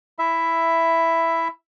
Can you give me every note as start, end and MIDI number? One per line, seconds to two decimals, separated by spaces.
0.19 1.48 64
0.19 1.48 76